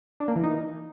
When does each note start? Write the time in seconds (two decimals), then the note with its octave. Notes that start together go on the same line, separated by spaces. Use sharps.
0.20 D4
0.28 A#3
0.36 E3
0.43 D#4